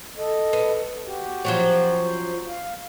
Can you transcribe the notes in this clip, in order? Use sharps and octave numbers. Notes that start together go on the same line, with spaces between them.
A4 D#5
B3
F#4 G4
F3 F#3 C#4
C5
F5